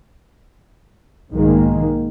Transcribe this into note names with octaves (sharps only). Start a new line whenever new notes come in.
B1 G#2 D#3 G#3 A#3